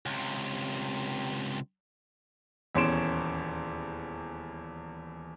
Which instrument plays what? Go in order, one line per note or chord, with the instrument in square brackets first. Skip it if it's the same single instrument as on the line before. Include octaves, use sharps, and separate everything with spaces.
[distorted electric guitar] C#2 C3
[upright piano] D#1 E2 C#4 C6 D7 E7